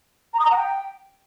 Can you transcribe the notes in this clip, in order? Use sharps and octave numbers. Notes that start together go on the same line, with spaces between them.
A#5
D#6
A#5
F#5
G5